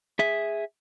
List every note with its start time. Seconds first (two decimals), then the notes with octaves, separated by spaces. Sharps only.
0.19 G#4 E5